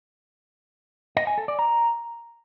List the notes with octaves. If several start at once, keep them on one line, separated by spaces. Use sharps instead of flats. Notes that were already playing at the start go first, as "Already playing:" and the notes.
D#5
G#5
A4
D5
A#5